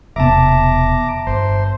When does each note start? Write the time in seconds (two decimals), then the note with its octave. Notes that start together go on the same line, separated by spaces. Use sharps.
0.16 E1 C3 B3 E5 A5 A#5 D6
1.27 G1 C5